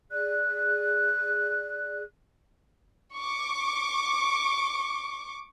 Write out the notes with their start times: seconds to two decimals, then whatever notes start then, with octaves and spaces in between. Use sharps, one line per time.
0.11 G#4 D5 F#6
3.15 C#6 D6